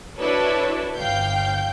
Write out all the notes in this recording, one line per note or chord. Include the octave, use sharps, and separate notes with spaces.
D4 E4 F#4 A4 B4 C#5
G1 F5 G5 G6